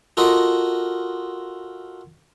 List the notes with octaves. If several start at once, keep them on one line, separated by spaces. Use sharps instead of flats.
F4 F#4 A4 A#4 D#5